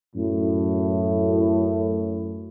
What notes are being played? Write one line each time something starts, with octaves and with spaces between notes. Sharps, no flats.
F#2 A2